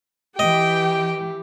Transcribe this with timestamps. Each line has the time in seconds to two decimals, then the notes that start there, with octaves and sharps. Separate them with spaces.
0.39 E3 G4 D#5 G5